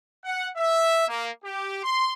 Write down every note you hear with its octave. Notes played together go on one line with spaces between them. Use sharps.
F#5
E5
A#3
G4
C6